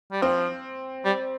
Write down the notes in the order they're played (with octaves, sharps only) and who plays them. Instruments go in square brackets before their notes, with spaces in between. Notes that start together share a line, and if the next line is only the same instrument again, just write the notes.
[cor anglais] G3
[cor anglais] F3 [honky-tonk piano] C4
[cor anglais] G3